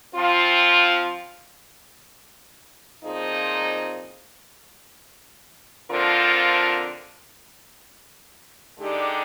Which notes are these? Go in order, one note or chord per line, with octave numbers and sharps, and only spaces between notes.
F3 C4 F4
A#2 F3 C4 D#4 G#4
D3 F3 C4 F4 A#4
D3 G#3 D#4 G4 D5